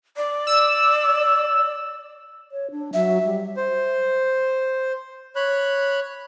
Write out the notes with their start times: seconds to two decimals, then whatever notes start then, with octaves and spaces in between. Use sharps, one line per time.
0.16 D5
0.47 E6
2.52 C#5
2.71 D4
2.94 F#3 E5
3.25 G3
3.57 C5
5.36 C#5 B5 F#6